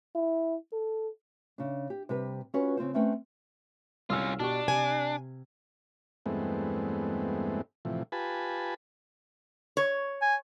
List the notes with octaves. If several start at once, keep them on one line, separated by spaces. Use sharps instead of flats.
E4
A4
C#3 D4
G4
C3 G3 G4 B4
C#4 F4 F#4 B4 C#5
C#3 C4 F4 C5
A3 C4 C#4 B4 G5
C2 C#4 F4 E6 F6
B2 D4 G4 C#6
C3 G#5
E2 G2 G#3 A3 B3 C4
A2 C3 E3 F3
F4 G4 B4 G#5 A5 B5
C#5
G#5